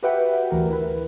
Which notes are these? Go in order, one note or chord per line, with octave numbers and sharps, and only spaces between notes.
F#4 G4 B4 E5 F#5 G5
D2 E3 A#4
E4 B4